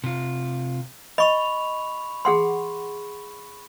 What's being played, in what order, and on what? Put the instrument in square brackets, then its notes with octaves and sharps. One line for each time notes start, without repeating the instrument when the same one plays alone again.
[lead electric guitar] C3 F4
[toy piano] D#5 [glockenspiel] B5 C#6 F7
[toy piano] G#4 F#5 C6